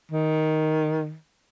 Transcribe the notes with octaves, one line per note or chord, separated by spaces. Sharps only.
D#3